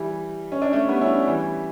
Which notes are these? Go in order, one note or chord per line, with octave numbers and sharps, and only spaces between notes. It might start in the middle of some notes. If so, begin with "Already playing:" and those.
Already playing: E3 G3
C#4
D4
A3 C#4
G3 B3
C#4 E4
E3 G3